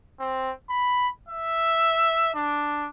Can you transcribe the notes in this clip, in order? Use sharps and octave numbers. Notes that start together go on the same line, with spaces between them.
C4
B5
E5
D4